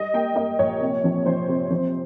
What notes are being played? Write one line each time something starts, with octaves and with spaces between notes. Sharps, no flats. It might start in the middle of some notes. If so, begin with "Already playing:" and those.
Already playing: G3 D#5
A#3 G5
A#3 D#5
A#1 C#5
C3
F3
F3 C5
C3
F3